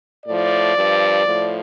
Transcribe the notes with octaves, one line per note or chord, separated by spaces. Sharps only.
A2 F3 D5
G2 F3
A2 F3